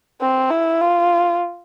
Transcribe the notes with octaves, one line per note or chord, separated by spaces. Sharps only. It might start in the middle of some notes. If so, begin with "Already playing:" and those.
C4
E4
F4